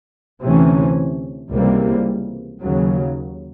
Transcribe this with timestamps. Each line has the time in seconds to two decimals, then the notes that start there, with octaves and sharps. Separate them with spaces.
0.43 D2 C3 E3 A3 C#4
1.51 C#2 C3 E3 G3 A#3
2.60 D#2 C#3 F#3